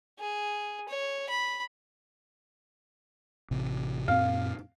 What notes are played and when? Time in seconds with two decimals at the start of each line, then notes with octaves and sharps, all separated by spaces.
0.19 G#4
0.89 C#5
1.29 B5
3.51 A1 C3
4.08 F#2 A#2 C4 F5